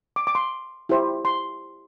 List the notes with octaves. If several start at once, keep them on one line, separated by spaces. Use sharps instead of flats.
D6
D6
C6
E4 G4 C5
C6